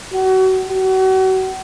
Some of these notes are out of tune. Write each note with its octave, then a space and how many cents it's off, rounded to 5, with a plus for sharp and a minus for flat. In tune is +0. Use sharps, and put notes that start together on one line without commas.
F#4 +30
F#4 +35